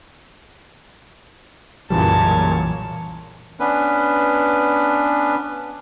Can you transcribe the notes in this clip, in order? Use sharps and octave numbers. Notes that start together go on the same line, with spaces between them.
B1 F#2 A#2 C#3 E3 G3 C#5 A5
B3 C#4 D4 B4